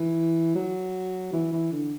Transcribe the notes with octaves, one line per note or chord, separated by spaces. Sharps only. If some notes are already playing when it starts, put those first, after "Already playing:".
Already playing: E3
F#3
E3
E3
D3